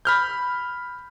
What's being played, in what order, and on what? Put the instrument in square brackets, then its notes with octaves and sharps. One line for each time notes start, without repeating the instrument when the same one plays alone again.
[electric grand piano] B5 F6 G6